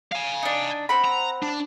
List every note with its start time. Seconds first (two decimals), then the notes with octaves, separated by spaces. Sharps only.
0.12 F5 G#5
0.43 D4 D#4
0.89 C4 F#5 B5
1.04 A#5
1.43 D4